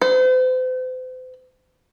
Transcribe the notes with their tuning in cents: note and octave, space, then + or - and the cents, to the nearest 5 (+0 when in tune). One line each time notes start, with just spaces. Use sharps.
C5 -40